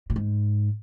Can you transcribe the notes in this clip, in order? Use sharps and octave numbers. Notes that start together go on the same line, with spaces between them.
A#2
G#2